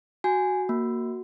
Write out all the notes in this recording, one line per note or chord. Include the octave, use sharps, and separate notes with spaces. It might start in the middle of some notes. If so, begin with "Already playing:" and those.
F#4 G#5
A#3